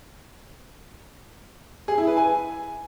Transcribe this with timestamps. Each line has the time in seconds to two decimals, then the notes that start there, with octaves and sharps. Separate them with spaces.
1.88 G#4
1.98 E4
2.07 B4
2.17 G#5